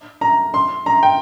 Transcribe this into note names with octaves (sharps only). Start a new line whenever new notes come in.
A#5
C6
A#5
G5